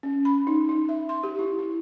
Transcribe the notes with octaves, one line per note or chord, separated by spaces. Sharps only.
C#4
B5
D#4
D#4
E5
C6
G4
E4
E4